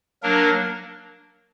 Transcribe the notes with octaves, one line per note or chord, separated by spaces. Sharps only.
F#3 A#3 D4 A#4